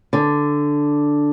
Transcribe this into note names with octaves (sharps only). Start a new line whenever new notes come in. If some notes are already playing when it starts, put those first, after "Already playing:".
D3